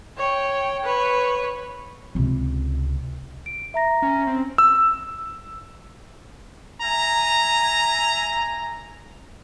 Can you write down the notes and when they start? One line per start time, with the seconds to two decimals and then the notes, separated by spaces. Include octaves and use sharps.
0.17 C#5 G5
0.84 B4 C#5
2.15 C#2 C3
3.46 D7
3.74 E5 A#5 A#6
4.02 C#4
4.27 C4
4.58 E6
6.82 E5 G#5 A#5